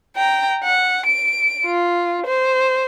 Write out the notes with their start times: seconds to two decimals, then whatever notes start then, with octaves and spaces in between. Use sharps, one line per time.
0.16 G5 A#5
0.63 F#5
1.06 D7
1.66 F4
2.26 C5